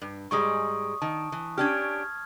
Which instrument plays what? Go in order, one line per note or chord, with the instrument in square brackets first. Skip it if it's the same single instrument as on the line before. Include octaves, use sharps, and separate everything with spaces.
[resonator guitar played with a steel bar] G2
[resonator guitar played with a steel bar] G#2 G3 G#3 [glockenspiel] C#6 D#6
[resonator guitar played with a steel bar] D#3 [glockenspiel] A5
[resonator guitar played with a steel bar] E3
[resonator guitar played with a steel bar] C#4 D4 G4 [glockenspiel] F6 G#6